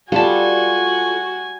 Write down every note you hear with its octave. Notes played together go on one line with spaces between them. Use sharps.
G3 F4 F#4 A4 G#5 A5